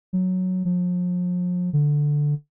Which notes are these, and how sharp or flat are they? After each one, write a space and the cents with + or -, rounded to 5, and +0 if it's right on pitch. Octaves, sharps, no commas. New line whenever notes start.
F#3 -5
F3 +40
D3 +0